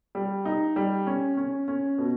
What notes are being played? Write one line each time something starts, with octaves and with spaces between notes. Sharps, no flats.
G3
D#4
G3
C#4
C#4
C#4
B2